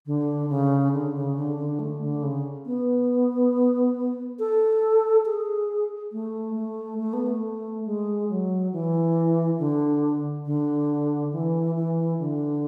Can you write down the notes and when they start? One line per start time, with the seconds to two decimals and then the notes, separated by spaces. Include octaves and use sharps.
0.06 D3
0.49 C#3
0.93 D3
1.14 C#3
1.36 D3
1.57 D3
1.79 A3
2.01 D3
2.23 C#3
2.66 B3
4.39 A4
5.25 G#4
6.12 A3
6.55 A3
6.99 A3
7.13 B3
7.26 A3
7.85 G#3
8.29 F#3
8.73 E3
9.59 D3
10.45 D3
11.32 E3
11.75 E3
12.19 D3